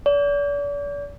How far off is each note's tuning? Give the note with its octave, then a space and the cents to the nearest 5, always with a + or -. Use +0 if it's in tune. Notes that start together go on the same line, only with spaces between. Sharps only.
D5 -40